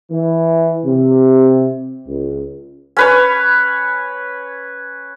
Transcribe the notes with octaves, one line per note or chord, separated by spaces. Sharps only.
E3
C3
C#2
C#4 B4 C#5